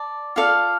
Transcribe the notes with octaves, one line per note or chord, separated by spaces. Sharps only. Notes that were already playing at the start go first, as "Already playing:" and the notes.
Already playing: D5 A5
F4 A4 D5 F5